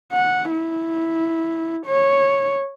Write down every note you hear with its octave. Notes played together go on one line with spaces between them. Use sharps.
F#5
E4
C#5